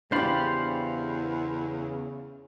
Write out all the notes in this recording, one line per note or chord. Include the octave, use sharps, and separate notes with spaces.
E2 C#3 D4 G4 C5 F5 B5